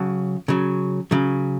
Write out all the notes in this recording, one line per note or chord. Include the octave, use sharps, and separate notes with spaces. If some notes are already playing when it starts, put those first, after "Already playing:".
Already playing: C#3 F#3 A5
C#3 F#3
C#3 F#3